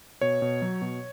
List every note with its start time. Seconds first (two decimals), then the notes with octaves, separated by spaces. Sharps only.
0.21 B2 C#5
0.42 B2
0.62 F#3
0.82 B2